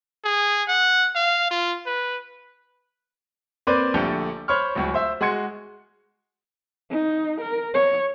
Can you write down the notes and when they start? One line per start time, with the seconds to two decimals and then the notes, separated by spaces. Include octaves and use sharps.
0.25 G#4
0.68 F#5
1.16 F5
1.51 F4
1.86 B4
3.67 A#3 C4 B4 C5 D5
3.94 A#1 D3 A3 G4 A4 G6
4.48 C5 C#5 B5 C#6 F6
4.75 D1 C#2
4.94 C5 E5
5.21 G#3 F#4 C6 G#6 C#7
6.91 D#4
7.41 A#4
7.74 C#5